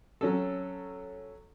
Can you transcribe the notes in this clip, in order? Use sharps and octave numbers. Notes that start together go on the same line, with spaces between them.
F#3 C#4 A4